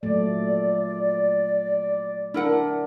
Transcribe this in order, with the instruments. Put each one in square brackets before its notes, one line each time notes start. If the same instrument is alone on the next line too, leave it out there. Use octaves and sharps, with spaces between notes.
[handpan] A#2 F#3 A3 [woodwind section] D5
[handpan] D4 [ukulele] E4 A#4 F#5